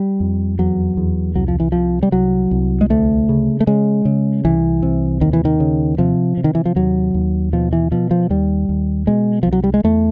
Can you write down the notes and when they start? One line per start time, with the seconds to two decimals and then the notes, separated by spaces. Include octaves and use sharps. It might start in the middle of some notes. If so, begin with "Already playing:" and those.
Already playing: G3
0.20 F2
0.59 E2 F#3
0.97 E2
1.35 C2 F#3
1.48 F3
1.60 E3
1.72 C3 F3
2.03 G3
2.12 C2 F#3
2.51 C2
2.81 G#3
2.90 D2 A3
3.29 C#3
3.60 A3
3.67 C#3 G#3
4.05 C#3
4.45 C2 E3
4.83 C3
5.21 D#2 D#3
5.33 E3
5.45 D#3
5.60 C#3
5.98 C3 F3
6.37 C3
6.44 D#3
6.55 E3
6.65 F3
6.76 D#2 F#3
7.14 D#2
7.53 B2 F3
7.73 E3
7.91 B2 F3
8.11 F3
8.30 D#2 G3
8.69 D#2
9.07 B2 G#3
9.43 C2 F3
9.53 F#3
9.64 G3
9.74 G#3
9.84 E2 A3